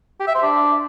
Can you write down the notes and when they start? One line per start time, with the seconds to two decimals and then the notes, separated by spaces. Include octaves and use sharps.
0.20 G4
0.27 E5
0.35 C5
0.42 D4